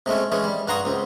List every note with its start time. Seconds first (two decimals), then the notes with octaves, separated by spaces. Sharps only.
0.06 C3 G#3 A3 C#4
0.32 E3 G#3 C#4
0.44 G3
0.68 G2 F#4 A#5 C6 C#6 D#6
0.85 C#2 C4